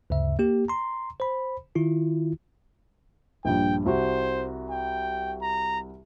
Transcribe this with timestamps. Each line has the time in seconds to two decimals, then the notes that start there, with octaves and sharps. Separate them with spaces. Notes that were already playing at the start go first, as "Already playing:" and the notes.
0.10 D2 G2 C#3 E5
0.39 A#3 G4
0.68 A#5 C6
1.20 C5 B5
1.75 D#3 E4 F4
3.45 A#1 G2 G5
3.86 C2 F#4 C5
4.70 G5
5.42 A#5